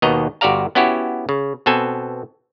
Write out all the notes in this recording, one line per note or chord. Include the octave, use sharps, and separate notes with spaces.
D#2 B2 D#3 B3 D#5 A#5
G1 F#4 G4 D5 F5 A#5
B3 C#4 E4 F#4 G4
C#3
B2 B3 C4 A4 G#5